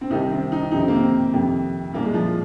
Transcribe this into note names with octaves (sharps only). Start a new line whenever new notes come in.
C4
C2 C3 D#3 D#4
C4
D#4
F2 C3 D#3 D#4
C4
A#3
C4
F2 C3 D#3
C2 A#2 A#3
G#3
F3